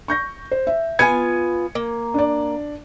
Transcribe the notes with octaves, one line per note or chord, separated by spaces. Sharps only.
C#6 G6 A#6
C5
E5
B3 F4 G#5 G#6 C#7 D#7
A#3
D4 D5